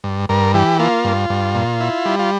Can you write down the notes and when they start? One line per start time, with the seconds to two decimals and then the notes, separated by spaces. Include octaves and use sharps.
0.04 G2
0.29 G2 A#4
0.54 E3 G4
0.79 A#3 F4
1.04 G2
1.30 G2
1.55 A#2
1.81 E4
2.06 G3
2.19 F4